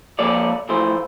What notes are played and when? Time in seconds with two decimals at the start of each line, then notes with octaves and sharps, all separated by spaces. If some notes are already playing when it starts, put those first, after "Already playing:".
0.19 F3 A#3 A4 C#5 D5
0.69 A2 E3 F3 A3 C5